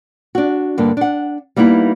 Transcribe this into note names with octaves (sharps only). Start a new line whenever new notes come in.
D4 F#4
G2 D3 A#3
D4 F#5
G3 A#3 B3 D#4 E4